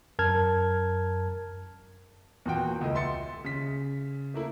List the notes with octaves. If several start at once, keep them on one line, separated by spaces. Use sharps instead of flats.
F#2 A#4 A5 F6 G#6
E2 A#2 F#4 G5
C#2 A3 D#5
E5 C6 A6 C#7
C#3 B6
A3 A#3 E4